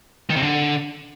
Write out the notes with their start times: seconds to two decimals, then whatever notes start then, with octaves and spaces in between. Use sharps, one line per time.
0.30 D#3
0.36 C3
0.42 D3